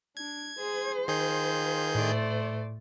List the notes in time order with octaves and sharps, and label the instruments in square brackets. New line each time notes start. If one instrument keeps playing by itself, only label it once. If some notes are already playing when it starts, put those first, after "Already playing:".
[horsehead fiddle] D4 [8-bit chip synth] G#6
[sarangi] G#4 [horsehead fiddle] C5
[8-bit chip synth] D#3 G#4 G6 [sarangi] F4
[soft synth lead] A2 [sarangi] A3 [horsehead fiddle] C5 D5